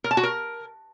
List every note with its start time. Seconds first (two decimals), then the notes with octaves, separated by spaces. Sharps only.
0.04 A#4
0.11 A5
0.17 F#4
0.23 A#4